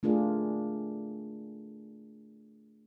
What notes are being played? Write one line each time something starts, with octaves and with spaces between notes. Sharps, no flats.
A3 D4 F4 G#4 A#4